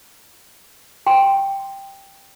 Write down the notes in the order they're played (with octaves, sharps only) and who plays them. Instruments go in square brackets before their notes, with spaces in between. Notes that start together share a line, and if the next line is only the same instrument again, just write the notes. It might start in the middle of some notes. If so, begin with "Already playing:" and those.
[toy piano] G5 C6